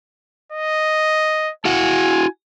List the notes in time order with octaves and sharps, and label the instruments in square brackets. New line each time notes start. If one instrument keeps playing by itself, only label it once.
[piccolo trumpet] D#5
[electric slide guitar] E4 F#4 F#5 [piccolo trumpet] G#5